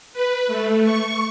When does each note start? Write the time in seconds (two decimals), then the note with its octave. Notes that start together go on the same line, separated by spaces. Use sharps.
0.13 B4
0.47 A3
0.83 C#6